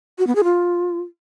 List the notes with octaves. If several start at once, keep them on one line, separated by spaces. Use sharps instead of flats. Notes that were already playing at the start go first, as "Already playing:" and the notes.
F#4
B3
G#4
F4